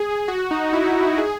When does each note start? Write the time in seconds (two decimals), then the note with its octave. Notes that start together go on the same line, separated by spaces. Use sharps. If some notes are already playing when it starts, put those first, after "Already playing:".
Already playing: G#4
0.28 F#4
0.51 D#4
0.73 E4
1.18 G#4